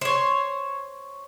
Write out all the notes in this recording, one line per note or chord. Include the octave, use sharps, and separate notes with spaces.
C5 C#5